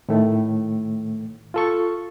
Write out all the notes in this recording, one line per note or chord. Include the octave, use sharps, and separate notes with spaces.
A2 D#3 A3
F4 A4 C#6